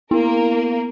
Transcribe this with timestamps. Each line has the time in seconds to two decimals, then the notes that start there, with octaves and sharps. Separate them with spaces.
0.11 A#3 B3 E4 A#4